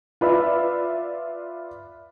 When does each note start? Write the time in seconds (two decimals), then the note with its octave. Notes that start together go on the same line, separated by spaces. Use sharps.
0.21 F4 B4 D5 E5